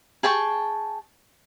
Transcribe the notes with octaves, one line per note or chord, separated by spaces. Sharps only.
G#4 G5 A5 C#6